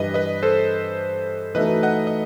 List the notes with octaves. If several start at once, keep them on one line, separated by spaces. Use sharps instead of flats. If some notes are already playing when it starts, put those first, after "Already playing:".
Already playing: G2 E3 G3 B4 D#5
B4 D#5
A4 C5
E3 A3 D#4 F#4 B4 D#5
D#5 F#5
D#5